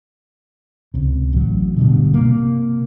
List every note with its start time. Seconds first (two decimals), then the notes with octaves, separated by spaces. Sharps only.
0.94 C#2 C3
1.33 A1 F#3
1.76 G2 B2 D3
2.14 C3 A#3